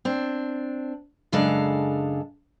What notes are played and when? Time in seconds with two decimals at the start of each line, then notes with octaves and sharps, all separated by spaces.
0.05 C4 D4
1.32 F#2 C#3 G#3 D4 A4 F5